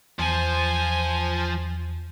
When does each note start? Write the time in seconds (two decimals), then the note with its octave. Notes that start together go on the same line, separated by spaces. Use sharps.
0.19 E2 F3 C5 G#5